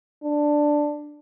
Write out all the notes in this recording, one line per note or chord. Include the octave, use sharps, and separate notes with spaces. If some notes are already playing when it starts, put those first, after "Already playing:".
D4